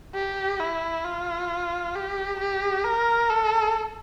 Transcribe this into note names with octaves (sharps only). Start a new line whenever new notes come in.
G4
E4
F4
G4
G4
A#4
A4